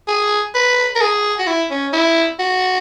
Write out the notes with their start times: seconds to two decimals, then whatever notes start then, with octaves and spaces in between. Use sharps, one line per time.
0.08 G#4
0.55 B4
0.95 A#4
1.01 G#4
1.39 F#4
1.47 E4
1.71 C#4
1.93 E4
2.39 F#4